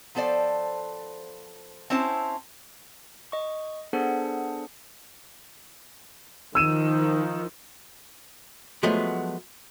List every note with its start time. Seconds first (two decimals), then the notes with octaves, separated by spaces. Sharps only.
0.15 F3 B3 A4 C5 D5
1.90 C4 C#4 E4 C5 A5
3.32 D#5 C#6
3.93 B3 D4 G#4 A4 C5 F#5
6.55 D#3 F3 E6 D#7 E7
8.83 F3 F#3 G#3 A3 B3